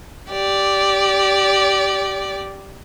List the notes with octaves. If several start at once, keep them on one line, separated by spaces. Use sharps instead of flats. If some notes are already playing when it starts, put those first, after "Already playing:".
G4 D5